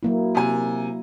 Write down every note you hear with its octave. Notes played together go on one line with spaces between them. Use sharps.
F#3 A#3 E4
C3 G#5